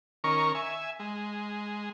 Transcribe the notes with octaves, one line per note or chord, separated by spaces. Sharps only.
D#3 C#4 A#4 C#6
E5 G#5
G#3